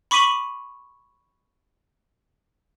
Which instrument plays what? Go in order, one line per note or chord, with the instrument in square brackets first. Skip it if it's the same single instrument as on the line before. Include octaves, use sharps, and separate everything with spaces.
[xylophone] B5 C#6 D6 B6 D#7 F#7